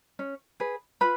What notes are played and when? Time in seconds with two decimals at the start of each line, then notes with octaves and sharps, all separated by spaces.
0.19 C#4
0.60 G#4 B4
1.01 F4 B4 B5